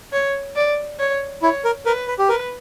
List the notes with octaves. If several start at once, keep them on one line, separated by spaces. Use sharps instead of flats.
C#5
D5
C#5
E4 C#5
A#4
A#4 B4
B4
G4
A#4 B4